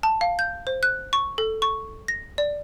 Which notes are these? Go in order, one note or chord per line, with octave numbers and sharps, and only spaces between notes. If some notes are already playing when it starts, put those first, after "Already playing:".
A5
F5
G6
C5
F#6
C#6
A4
C#6
A#6
D5